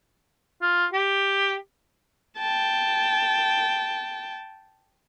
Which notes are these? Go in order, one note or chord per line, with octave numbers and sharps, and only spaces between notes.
F4
G4
G5 A5